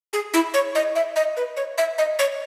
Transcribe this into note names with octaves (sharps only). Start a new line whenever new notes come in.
G#4
E4
C#5
D#5
E5
D#5
B4
C#5
E5
D#5
C#5